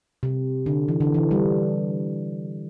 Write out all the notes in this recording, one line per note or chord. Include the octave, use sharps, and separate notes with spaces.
C3
D3
E3
D3
E3
G3